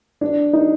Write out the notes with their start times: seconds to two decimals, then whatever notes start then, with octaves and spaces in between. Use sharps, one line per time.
0.21 D4
0.53 D#4